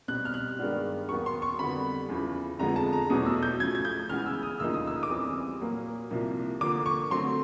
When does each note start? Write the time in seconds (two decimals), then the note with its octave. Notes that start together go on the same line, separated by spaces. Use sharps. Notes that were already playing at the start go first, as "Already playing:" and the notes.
0.08 B2 G3 C4 F#6
0.25 F6
0.34 F#6
0.59 G2 D#3 G#3 B3 D4
1.09 D#2 D#3 F#3 B3 C#6
1.26 C6
1.42 C#6
1.59 F2 D3 G3 B3 B5
2.09 E2 C#3 F3
2.59 F2 D3 F3 G#3 B3 A#5
2.76 A5
2.93 A#5
3.10 E2 B2 F#3 A3 D#6
3.26 E6
3.43 G6
3.60 C#3 F3 A3 G#6
3.75 G#6
3.85 G6
4.09 C#3 E3 G#3 B3 F6
4.26 E6
4.43 D#6
4.60 D2 C#3 F3 A#3 D#4 E6
4.74 D#6
4.87 E6
5.03 D6
5.09 E2 C#3 E3 G3 C4 D#6
5.61 A#2 F#3 A#3
6.11 C2 C3 F3 A#3
6.61 D3 F3 A#3 D6
6.86 C#6
7.11 D3 F#3 A3 C4 C6